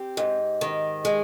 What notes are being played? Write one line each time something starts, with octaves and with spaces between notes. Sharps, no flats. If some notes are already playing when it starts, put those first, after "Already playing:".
Already playing: C4 G4
G#2
D#3
G#3